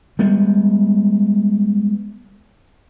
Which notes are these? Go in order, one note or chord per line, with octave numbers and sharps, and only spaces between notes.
G3 G#3 B3